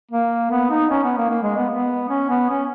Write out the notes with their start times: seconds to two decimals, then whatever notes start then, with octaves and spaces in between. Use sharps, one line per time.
0.11 A#3
0.51 B3
0.70 D#4
0.90 C#4
1.04 B3
1.17 A#3
1.30 A#3
1.43 G#3
1.57 B3
1.70 B3
2.09 C#4
2.29 B3
2.50 C#4